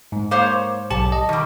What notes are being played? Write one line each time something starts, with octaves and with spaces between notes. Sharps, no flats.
G#2
A#3 C5 C#5
B1 G4 A5
D#5
D#3 G3